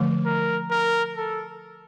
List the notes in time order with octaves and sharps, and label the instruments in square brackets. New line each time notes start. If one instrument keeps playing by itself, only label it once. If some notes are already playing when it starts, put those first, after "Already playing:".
Already playing: [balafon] D3 F3 A3
[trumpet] A#4
A#4
A4